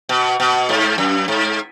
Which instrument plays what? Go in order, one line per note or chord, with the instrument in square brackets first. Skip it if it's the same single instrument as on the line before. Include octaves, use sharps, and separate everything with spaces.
[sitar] B2
B2
G#2
F#2
G#2